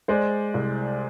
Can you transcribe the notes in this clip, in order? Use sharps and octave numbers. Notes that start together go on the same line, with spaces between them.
G#3 C5 D5
C2